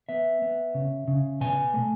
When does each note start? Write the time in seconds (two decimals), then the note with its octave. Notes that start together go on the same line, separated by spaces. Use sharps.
0.09 B3 E5
0.42 B3
0.75 C#3
1.08 C#3
1.41 B2 G#5
1.74 A3